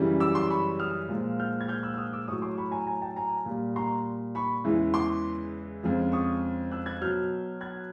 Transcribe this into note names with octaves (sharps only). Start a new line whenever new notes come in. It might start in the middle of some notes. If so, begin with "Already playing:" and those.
Already playing: F#2 C#3 E3 G3
D6 E6
C6 D6
B5 C#6
D#6 F6
A#2 F3 G#3
F6 G6
G#6
F6 G6
E6 F#6
E6
D#6 F6
D6 E6
A2 F#3 C#6 D#6
C6 D6
B5 C#6
G#5 A#5
G#5 A#5
G5 A5
G#5 A#5
A#2 G3
A#5 C6
B5 C#6
E2 C#3 E3 G#3
C6 D6
F2 C#3 F3 G#3
C#6 D#6
E6 F#6
F#6 G#6
B2 F#3 F6 G6
F#6 G#6